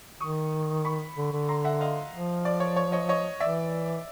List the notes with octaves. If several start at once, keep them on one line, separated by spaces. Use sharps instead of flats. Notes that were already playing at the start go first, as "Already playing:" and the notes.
D#3 C#6 D#6
B5 C#6
D3
D3
A#5 C6
E5 F#5
D#5 F5
F3
D5
C#5
C#5
C#5 D#5
C#5 D#5
E3 D5 E5